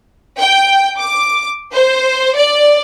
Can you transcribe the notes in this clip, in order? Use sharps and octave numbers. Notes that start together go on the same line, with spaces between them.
G5
D6
C5
D5